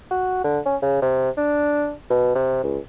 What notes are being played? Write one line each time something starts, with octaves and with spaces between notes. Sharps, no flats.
F#4
D3
C#4
C#3
C3
D4
B2
C3
C#2